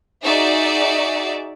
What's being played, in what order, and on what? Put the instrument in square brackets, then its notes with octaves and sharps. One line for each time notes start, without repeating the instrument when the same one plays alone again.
[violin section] D#4 F#4 G#4 D5 E5